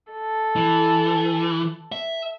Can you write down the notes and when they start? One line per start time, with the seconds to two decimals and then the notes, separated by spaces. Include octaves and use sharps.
0.12 A4
0.56 E3
1.92 E5